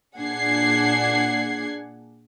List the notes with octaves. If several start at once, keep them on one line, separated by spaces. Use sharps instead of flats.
A#2 D4 G#4 F#5 G#6 C7